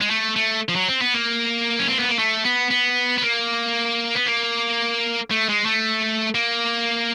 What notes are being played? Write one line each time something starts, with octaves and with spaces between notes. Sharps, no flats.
G#3
A3
A3
F3
F#3
C4
B3
A#3
C#4
C4
B3
A#3
A3
B3
B3
B3
A#3
B3
A#3
A3
G#3
A3
A#3